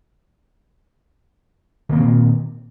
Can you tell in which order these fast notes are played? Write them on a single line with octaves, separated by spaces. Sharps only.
D#3 A#3 C4 A#2